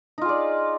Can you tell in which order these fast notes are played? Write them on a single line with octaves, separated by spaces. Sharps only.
D#4 F4 G#4 D5